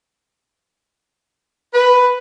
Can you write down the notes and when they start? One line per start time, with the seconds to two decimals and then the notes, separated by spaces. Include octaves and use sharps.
1.73 B4